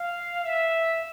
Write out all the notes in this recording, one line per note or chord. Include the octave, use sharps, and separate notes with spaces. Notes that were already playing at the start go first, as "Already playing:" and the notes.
Already playing: F5
E5